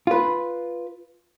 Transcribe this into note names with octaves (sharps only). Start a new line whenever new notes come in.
F4 B4